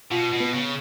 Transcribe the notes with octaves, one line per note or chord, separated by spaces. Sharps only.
B2 F4
B2
B3
C#3